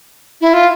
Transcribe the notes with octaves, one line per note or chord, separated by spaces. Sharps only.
E4
F4